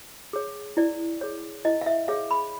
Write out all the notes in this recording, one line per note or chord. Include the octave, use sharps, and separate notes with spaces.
G#4 C#5
E4 D5
G#4 C#5
E4 D#5
F5
E5
G#4 C#5 F5
B5